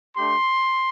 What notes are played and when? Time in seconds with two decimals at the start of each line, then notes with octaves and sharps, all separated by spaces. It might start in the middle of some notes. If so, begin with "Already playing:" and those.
0.15 A3 D4 G4 C6